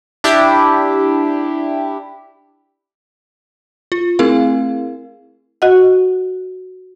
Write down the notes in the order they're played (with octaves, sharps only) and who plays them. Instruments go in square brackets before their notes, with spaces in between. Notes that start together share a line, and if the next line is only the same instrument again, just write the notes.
[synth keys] D4 E4 G4
[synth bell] F4
A3 C4 E4 G#4 A#4 F5
[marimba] F#4 D#5 F#5